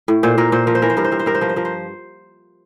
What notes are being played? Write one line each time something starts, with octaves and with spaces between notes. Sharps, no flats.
A2
A#2 C5
A#2 A#4
A#2 C5
F3 A#4
C5
E3 A#4
C5
G2 A#4
C5
G2 A#4
C5
G2 A#4
C5
F3 A#4
C5
F3 A#4
C5